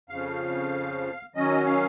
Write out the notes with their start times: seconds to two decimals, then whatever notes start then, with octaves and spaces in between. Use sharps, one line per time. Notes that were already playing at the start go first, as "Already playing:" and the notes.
0.09 F2 C#3 F3 F5
1.35 D#3 F#3 C#4 D#5
1.66 F5